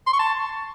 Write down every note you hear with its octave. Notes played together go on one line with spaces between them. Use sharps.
C6
C#6
A5